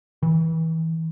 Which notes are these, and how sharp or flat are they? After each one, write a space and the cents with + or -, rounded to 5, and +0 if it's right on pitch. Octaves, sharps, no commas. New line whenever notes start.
E3 -30